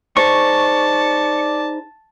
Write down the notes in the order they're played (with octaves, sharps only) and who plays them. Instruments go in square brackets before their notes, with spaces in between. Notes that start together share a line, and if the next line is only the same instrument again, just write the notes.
[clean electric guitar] D#4 G#4 C5 [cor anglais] D5 [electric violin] A5 [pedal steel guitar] C#6